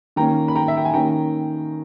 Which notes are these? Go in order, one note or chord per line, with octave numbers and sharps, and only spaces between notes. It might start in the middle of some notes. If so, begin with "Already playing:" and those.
D#3 A#3 C#4 G5 A#5
B5
G5 A#5
E5
G5
G#5
D#3 A#3 C#4 G5 A#5